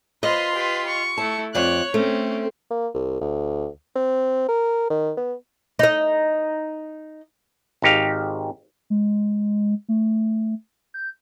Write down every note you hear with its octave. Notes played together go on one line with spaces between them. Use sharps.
F4 B4 C5 D#5 C6
G4 B4
C#6
A3 E4 A5
F2 C#5 D5 F#6
A3 C4 C#4
A#3
C2
D2
C4
A#4
D#3
B3
D#4 D#5
G#1 D#4 G4 F5
G#3
A3
G6